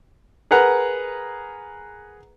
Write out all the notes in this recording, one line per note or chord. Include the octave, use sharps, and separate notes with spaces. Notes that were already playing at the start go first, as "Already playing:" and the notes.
G#4 A#4 B4 F#5 A#5